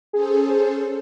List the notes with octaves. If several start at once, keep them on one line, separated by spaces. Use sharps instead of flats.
C#4 G#4 A4 C5